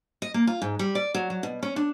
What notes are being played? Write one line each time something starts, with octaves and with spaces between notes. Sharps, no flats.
D#5
A#3
F4
G#2
G3
D5
F#3
F#3
B2
C#4
D4